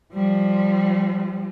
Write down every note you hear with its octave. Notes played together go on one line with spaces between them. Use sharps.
F3 G3